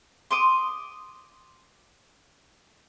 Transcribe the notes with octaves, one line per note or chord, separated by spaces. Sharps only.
C6 D6 D#6